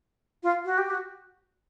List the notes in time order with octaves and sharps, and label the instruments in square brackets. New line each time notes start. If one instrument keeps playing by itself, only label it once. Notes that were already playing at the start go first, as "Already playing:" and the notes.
[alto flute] F4
F#4
G4
F#4